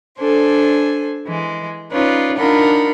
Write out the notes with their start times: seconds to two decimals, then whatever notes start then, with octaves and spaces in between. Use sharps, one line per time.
0.19 D4 A4 C5 G#5
1.24 E3 G#3
1.90 C#4 D#4 F4 B4 C#5 D5
2.37 D4 D#4 F4 A#4 F#5 B5